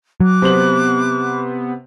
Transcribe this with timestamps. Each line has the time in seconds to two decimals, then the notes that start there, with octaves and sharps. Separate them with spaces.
0.20 F#3 D6 F#6
0.42 C3 B3 C5 F#7